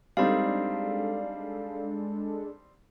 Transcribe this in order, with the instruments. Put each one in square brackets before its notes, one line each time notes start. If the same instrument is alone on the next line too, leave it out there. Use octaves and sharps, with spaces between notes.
[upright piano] G3 C4 D#4 [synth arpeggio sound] G#3 D4 A4 [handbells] D5 F5